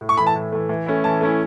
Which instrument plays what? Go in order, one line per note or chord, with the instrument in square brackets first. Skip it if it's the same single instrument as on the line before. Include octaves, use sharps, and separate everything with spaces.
[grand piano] A2
[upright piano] C#6
[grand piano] E3 A3 [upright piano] B5
[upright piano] A5
[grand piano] A2
E3 A3
E3
A3 C#4 E4
[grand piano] E3 [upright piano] A5
[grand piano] A3 C#4 E4